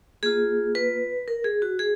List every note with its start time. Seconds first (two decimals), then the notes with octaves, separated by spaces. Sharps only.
0.23 A#3 F4 G#4
0.75 B4
1.28 A#4
1.44 G#4
1.62 F#4
1.79 G#4